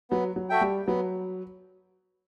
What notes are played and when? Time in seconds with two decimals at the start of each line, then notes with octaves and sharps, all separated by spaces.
0.11 F#3 B3
0.36 F#3
0.50 F#4 A4 E5 G5
0.61 G3
0.87 F#3 B3